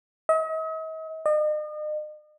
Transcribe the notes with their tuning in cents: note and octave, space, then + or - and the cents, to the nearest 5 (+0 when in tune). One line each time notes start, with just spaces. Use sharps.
D#5 +45
D#5 -40